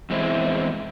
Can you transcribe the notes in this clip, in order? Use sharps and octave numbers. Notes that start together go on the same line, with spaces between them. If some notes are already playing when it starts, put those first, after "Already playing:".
E2 G#3 C4 E4